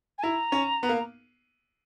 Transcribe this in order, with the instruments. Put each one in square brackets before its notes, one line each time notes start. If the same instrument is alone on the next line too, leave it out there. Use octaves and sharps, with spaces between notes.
[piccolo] G#5
[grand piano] E4 [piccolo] A#5
[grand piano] C#4
B3
A#3